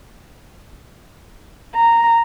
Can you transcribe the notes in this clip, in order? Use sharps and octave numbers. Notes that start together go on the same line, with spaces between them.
A#5